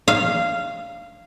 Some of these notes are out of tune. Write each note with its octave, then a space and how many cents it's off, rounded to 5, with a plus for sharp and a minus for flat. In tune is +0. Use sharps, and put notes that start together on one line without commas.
F5 -15